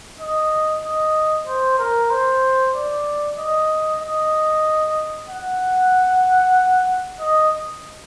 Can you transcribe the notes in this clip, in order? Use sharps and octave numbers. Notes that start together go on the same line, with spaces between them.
D#5
D#5
C5
A#4
C5
D5
D#5
D#5
F#5
D#5